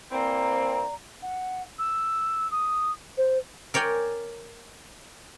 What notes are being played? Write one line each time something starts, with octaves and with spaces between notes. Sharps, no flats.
E3 A#3 C4 D5 A#5
F#5
E6
D#6
C5
A#4 C#5 D5 G5 G#5